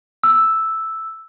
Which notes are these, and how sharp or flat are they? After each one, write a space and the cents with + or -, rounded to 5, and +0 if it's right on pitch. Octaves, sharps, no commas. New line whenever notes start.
E6 -5